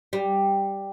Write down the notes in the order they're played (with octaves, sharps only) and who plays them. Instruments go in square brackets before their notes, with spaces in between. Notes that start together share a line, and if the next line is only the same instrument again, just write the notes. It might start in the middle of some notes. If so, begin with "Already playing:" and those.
[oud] G3